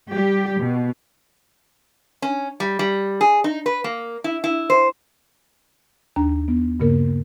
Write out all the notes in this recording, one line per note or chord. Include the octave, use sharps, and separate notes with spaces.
G3 G4
B2
C#4
G3
G3
G#4
D#4
B4
A#3
E4
E4
C5
D#2 D4 A#5
B3
G2 C#3 A#3 A#4